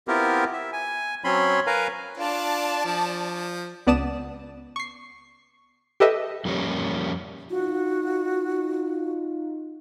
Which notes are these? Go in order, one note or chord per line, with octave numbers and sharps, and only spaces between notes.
B3 C4 E4 F4 G4 A#4
E5
G#5
F#3 C4 C#4 C#5 B5 C6
A#4 B4 F5 G#5 A#5
D4 F4 D5 A5
F3
C#2 B3 D5 A5 D#6 E7
C#6 C7
G4 A4 B4 D#5 E5
F2 G3 A#3 C#4
D#4 F4 F#4